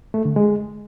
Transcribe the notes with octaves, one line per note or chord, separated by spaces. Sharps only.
A3
D3
G#3